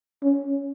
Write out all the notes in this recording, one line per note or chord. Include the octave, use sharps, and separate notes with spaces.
C#4